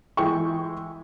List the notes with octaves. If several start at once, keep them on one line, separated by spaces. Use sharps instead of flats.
E3 G#3 G5 C#6